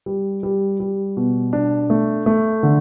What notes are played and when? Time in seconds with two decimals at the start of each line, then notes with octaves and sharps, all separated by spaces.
0.06 G3
0.43 G3
0.80 G3
1.17 B2
1.53 D4
1.90 A3
2.26 A3
2.63 D3